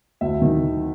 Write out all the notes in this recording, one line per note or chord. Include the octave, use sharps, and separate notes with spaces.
D2 E5
D#3